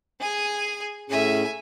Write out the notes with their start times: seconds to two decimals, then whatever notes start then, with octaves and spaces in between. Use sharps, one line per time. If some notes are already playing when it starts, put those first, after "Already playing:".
0.20 G#4 G#5
1.10 A2 C#4 G#4 E5 G#5